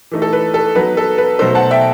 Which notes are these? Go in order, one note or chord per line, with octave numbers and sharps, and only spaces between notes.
E3 A3 D#4
A4
B4
A4
F#3 B3 D#4 B4
A4
B4
B2 F#3 A3 D#4 A4 C5
F#5 A5
E5 G5